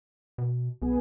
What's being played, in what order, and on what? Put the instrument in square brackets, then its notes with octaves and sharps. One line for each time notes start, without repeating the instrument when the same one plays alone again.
[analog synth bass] B2
[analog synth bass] B1 [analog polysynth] B3 G#4